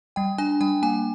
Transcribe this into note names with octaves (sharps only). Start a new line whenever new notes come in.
G3 G5
D4 G#5
G3 G5
A#3 G#5